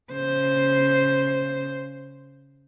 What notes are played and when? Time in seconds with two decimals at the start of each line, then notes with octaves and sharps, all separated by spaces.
0.13 C#3 C5